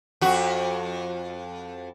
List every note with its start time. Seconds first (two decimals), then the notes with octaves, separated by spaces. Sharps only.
0.21 F2 F#4